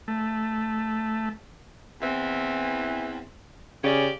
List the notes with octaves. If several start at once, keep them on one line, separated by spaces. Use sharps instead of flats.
A3
E2 E3 C4
C#3 C#4 G4 D5